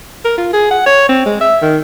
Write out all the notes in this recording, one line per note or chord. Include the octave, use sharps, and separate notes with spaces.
A#4
F4
G#4
F#5
C#5
C4
G#3
E5
D#3